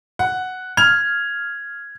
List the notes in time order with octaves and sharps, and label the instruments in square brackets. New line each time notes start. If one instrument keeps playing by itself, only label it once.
[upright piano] F#5
[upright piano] F6 F7 [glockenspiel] G#6